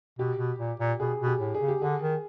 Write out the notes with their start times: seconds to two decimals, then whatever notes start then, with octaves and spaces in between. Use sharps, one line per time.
0.19 B2 G4
0.38 B2
0.59 A#2
0.80 A#2
0.99 B2 G#4
1.20 B2
1.27 G4
1.40 A2
1.54 G#4
1.60 C#3
1.68 G4
1.82 D3 G#4
2.02 D#3